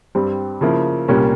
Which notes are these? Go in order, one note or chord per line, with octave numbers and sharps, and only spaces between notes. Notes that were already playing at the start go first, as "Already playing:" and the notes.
G2 G3 C4
C#3 F3 A#3 E4
C2 A#2 G3 A#3 C#4